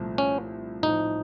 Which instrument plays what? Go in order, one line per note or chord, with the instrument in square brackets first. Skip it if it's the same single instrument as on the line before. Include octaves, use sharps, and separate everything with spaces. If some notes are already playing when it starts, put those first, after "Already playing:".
Already playing: [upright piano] C2 A#2 F3 A3
[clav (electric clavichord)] C#4
[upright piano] A1 A2 F3 C4 [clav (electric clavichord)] D#4